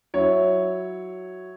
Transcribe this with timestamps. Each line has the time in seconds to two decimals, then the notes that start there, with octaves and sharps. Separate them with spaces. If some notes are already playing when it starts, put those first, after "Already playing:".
0.14 F#3 E4 C#5